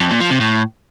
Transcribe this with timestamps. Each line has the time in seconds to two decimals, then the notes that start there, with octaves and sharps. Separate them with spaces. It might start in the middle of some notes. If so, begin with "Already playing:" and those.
0.01 F2
0.11 A#2
0.21 F3
0.30 C3
0.40 A2